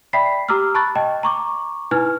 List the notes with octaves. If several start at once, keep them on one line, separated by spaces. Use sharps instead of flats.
D5 E5 G5 B5 B6 C7
G4 A#5 D6 E6 F6
A5 B5 C#6 F#6 A6
D#5 G5 A5
A#5 C#6 D6
D#4 E4 B4 G#5 F6